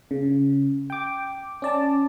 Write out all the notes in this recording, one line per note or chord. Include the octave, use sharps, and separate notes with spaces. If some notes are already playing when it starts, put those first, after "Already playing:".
C#3
G5 D6
C#4 D5 A5